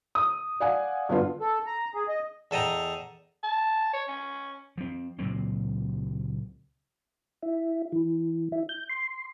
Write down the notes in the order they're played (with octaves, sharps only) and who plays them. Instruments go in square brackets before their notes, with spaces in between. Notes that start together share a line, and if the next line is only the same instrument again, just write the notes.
[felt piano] D#6
D5 F5 F#5 G#5
G2 D3 B3 F4
[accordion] A4
A#5
G#4
D#5
[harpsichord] E2 A4 D#5 G5 A#5
[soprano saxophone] A5
C#5
C#4
[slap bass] F3 C4
C#2 A#2 F#3 C4
[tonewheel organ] E4
E3
E4
G6
C6